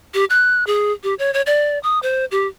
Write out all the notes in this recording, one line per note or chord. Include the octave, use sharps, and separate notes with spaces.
G4
F#6
G#4
G4
C#5
C#5
D5
D#6
C5
G4